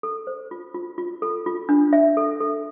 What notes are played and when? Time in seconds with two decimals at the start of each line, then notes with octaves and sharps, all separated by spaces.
0.03 A4
0.27 C5
0.51 F4
0.74 F4
0.98 F4
1.22 A4
1.46 F4
1.69 D4
1.93 E5
2.17 A4
2.40 A4